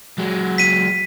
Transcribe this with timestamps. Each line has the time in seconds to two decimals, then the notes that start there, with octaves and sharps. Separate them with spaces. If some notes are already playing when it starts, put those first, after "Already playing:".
0.18 F#3 G#3
0.58 B6 D#7